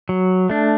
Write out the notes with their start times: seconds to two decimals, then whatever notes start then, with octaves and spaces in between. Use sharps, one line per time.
0.09 F#3
0.50 A3 D4